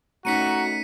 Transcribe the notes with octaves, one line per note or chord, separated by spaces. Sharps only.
A3 C#4 D#4 F#4 A#5 B6 C#7 D#7